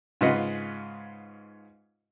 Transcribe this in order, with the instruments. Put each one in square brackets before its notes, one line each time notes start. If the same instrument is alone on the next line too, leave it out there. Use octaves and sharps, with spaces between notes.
[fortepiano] G#2 C#3 F4 B4 D#5 F#5